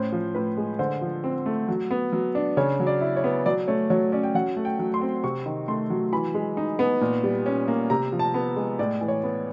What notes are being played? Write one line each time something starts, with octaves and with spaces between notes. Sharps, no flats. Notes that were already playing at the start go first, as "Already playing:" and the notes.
Already playing: A2 C#4 C5
F3
A2 B4
G#3
D3 C5
F3
C4
A3
F#3
B3
F#3
D4
C#3 C#5
F#3
D5
E4
C#5
B3
F#3 D5
A3 C#5
F#3 C#5
C#4 D5
G5
F#3 F#5
A3
G5
F#3
C6
C4
C3 C#6
D#3
A3 C6
F#3
E3 B5
G#3
D#4
B3
A#2
G3
C#4
A#3
C3 A#5
F3
A5
B3
G#3
A2 D5
E3
C#5
B3